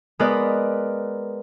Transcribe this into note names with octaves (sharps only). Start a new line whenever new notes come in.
G#3 B3 A#4 B4 D5